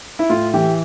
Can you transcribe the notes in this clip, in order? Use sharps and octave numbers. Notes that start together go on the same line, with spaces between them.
E4
A2 F4
E3 G4